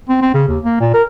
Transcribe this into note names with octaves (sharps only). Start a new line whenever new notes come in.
C4
C4
C#3
D#2
A#3
A#2
A#4